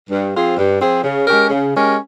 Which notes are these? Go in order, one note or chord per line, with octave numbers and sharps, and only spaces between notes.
G2
F3 C4 F4 G#4
G2
F3 C4 F4 G#4
C#3
G#3 C#4 G4 A#4
C#3
G#3 C#4 G4 A#4